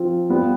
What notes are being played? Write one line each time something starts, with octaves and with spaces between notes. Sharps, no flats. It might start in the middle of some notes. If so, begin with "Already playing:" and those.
Already playing: F3 C4 F4
G3 B3 F4